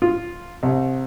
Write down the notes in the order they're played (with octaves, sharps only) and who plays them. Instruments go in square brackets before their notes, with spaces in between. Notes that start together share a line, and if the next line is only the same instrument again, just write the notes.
[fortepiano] F4
C2